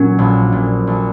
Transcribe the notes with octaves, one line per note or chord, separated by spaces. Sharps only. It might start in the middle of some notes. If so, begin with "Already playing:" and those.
Already playing: A#2 F#3 C#4
A#1
A#2
A#1